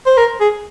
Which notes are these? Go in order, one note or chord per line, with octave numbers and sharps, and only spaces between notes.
C5
A#4
G#4